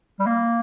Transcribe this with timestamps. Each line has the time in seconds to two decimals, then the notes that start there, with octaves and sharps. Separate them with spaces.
0.20 G3
0.26 A#3